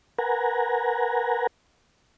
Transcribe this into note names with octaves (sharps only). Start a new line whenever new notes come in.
A#4 B4 F#5 G#5 A#5